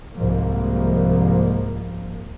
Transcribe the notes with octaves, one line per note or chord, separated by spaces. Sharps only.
C2 G#2 F3 A#3